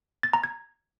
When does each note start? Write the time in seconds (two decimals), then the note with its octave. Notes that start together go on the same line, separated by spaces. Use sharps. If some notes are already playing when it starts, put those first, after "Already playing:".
0.23 A6
0.33 A#5
0.44 G#6